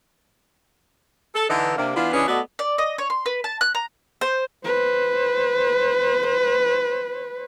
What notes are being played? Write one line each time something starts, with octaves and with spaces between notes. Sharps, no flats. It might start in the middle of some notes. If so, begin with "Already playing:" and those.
A4
D3 E3 D#4
C3 A#3 D4
E3 B3 D4 F4
E3 C#4 D4 G#4 B4 D#5
A3 B3 F#4 A4 D5 D#5
D5
D#5
C#5
C6
B4
A5
F#6
A#5
C5
B4 C5